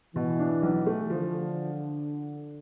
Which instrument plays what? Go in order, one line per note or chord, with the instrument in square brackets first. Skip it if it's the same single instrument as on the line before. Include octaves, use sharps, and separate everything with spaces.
[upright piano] B2 [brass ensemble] E3
[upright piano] D4
B1
A3
[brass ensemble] D3 [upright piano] F3